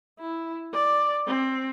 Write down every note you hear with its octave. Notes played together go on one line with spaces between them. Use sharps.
E4
D5
C4